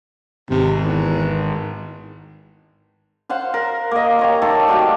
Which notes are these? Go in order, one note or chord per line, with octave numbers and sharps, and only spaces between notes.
G#1 C3
E2
C5 F5 F#5 C6
A#4
A#3 D#5
G4 C#5 A#5
D#3 A3 A4
G3 F#4 G4 F5